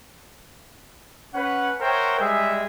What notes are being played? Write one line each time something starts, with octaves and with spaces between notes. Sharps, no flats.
C#4 B4 F#5
A#4 C5 C#5 E5 F#5 G5
G3 G#3 G#4 E5